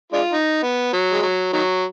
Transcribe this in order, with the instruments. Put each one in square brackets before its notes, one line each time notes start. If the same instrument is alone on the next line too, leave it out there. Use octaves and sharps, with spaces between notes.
[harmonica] G#3 D4 F4
D#4
B3
F#3
G#3
F#3
D#3 F#3